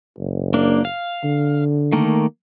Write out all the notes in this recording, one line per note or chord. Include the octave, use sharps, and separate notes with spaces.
F#1
A#3 D4
F5
D3
D#3 A3 A#3